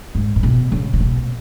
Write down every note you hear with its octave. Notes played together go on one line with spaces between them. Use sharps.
G#2
G#2
B2
C#3
C#3
B2